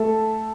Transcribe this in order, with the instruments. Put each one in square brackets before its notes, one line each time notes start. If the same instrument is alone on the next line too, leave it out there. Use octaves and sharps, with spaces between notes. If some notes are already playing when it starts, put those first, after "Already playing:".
Already playing: [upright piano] A3 A4